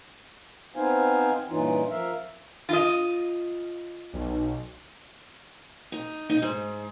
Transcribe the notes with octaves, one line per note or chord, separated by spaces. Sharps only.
B3 C4 D#4 C5 F5 G#5
G2 A#2 E3 C#4 D#4 F4
F3 A#4 E5 F5
F4 D#5
B1
D#4
D#4
G#2